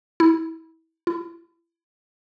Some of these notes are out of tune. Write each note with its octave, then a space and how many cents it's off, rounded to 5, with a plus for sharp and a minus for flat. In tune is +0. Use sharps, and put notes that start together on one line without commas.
E4 -25
E4 +35